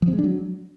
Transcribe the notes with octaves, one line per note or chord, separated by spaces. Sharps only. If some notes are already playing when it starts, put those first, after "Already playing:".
F3
C4
G#3
D4
F#3